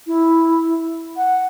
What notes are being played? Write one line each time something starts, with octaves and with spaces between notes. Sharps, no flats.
E4
F#5